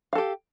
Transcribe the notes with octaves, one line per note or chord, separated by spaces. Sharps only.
G4 A4 F5